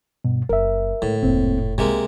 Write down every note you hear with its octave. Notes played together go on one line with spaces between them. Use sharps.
G2 B2
F#1 A#4 E5
A2 D3 G#3
F1 D2 G#2 A#3 C4
C2 C3 G#3 A#3